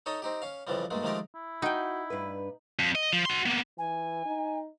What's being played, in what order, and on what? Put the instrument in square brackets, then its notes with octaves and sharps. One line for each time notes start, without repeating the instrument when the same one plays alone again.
[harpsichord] D#4 A4 C#5 D#5 D#6
C4 D#4 G4
C#4 F5
F2 C#3 E3 F3 G3
G2 A#2 G#3 A3
D#3 F3 G#3 A3 G4 A#4
[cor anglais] E4
[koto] D#4 G5 [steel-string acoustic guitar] F#4
[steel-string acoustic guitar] G2 B4
[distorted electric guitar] F2
D#5
F3
F#4 C6
A#3 B3
[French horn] E3 [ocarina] G#5
[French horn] D#4